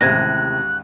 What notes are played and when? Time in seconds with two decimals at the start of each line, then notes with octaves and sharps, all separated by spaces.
0.01 A1 D#2 A2 C3 G#3 F#6 G#6 A#6